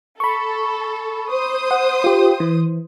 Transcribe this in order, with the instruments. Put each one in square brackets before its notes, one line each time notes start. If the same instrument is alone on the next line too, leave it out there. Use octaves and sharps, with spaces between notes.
[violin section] A4 [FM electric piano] B5 C#6
[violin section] C5 D#6
[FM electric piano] F#5
F4 G4
E3